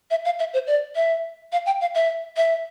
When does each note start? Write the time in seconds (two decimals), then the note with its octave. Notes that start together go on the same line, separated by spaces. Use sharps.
0.11 E5
0.25 F5
0.39 E5
0.54 C5
0.67 D5
0.96 E5
1.52 F5
1.66 G5
1.81 F5
1.95 E5
2.37 E5